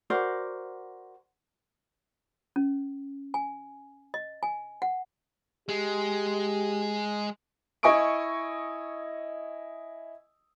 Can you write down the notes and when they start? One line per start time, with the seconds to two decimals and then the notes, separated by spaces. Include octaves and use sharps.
0.10 F#4 A#4 C5 D5
2.56 C#4
3.34 G#5
4.14 D#5
4.43 G#5
4.82 F#5
5.69 G#3 G4
7.83 E4 D#5 G#5 C#6 D#6 D7